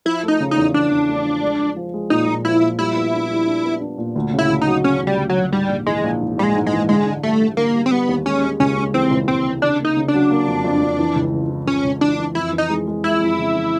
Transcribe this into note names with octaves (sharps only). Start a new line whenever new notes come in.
F3 E4
A3 D#4
C#3
D#4
E2
E2 D4
E2
A3
F3
G#3
F3
F3
G#3
A#2 D#4
A#2
F3 E4
A#2
G3 E4
B3
D4
G3
D4
B3
D4
A#2
D2
C#3
E4
D2
D#4
F#3
C#3 C#4
D2
G3
D2
F#3
D2
G#2 G3
A#1
E3 G#3
A#1
G#2
A#1 G3
G#3
G#2
G#3
E3
D3 G#3
D3
G3 A3
D3
D3 A#3
G3
C4
G3 B3
D#2
G#3 C#4
G#3
C#2 C#4
G#3
E3 C4
C#2
C#2 C4
C3
C#3 D4
A#3 D#4
C#3
D4
F#3
A#3
F2
F2
F2
E3
C#2
C#3
E3
C#2 C#4
C#2
E3 D4
E3
F2 E4
E3
D#4
G#3
G#3
G#3 E4
F2
C#3
E3